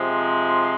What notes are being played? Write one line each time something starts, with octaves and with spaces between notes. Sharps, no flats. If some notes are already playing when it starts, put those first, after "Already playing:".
Already playing: C3 F3 G#3
C6